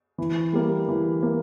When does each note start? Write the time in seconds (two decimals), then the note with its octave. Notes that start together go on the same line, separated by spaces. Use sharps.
0.18 E3
0.53 G3 A#3
0.88 E3
1.23 A#3